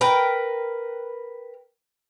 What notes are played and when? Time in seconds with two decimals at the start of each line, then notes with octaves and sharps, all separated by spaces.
0.01 A#4 B4 G5